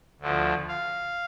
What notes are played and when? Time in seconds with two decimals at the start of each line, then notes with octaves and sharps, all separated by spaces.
0.21 D2 D3 F3
0.68 F5